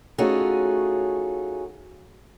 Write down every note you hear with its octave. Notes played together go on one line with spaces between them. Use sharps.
A3 C#4 D#4 F4 F#4 G#4